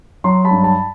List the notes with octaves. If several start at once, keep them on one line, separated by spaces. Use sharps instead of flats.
F#3 A#5 C6
A5 B5
G2
A5 B5